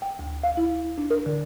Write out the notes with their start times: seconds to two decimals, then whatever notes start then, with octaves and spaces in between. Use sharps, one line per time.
0.02 G5
0.19 D2
0.43 F5
0.57 E4
0.98 D4
1.10 A#4
1.26 D3